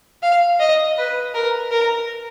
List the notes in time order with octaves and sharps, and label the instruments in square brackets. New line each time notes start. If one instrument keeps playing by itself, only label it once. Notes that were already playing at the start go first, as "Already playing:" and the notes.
[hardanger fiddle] F5
D#5
B4
A#4
A#4